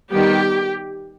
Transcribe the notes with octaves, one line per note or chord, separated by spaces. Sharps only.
D#3 G3 B3 G4